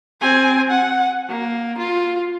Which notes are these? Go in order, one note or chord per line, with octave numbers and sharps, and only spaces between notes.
C4 G#5
F#5
A#3
F4